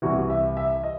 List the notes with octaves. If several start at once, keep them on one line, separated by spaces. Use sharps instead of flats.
C2 C3 E3 F#4
E5
E5
D#5